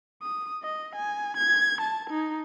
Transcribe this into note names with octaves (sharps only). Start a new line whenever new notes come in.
D#6
D#5
G#5
G#6
A5
D#4